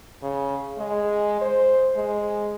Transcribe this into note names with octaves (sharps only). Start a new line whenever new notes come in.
C#3
G#3
C5
G#3